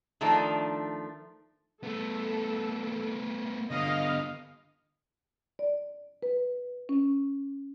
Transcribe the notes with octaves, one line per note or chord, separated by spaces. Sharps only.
D#3 F3 A3 D4
A3 B3 A4
D3 B3 D#5 F5
D5
B4
C#4